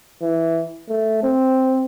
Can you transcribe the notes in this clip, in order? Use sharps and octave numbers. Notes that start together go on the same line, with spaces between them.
E3
A3
C4